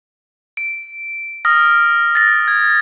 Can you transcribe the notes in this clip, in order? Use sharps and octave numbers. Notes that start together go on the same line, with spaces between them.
D7
D#6 F6 A#6
A6 A#6
G#6